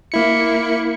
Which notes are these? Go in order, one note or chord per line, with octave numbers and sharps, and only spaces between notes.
A#3 E4 C#7